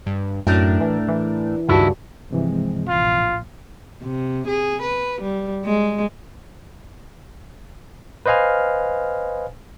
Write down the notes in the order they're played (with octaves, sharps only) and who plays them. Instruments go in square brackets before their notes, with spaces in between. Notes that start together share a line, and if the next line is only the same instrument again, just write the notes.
[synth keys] G2
[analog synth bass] F#2 [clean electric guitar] A2 A3 [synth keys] D4 A#4
[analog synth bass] E3
E3
[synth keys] C#2 [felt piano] G2 F#4 A5 [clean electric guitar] D#3 E4
[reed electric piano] G2 C3 E3 [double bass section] F3 G#3 C4
[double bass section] A#1 A2 [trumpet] F4
[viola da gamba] C3
G#4
B4
G3
G#3
[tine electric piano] B4 C5 D#5 F5 G#5 F6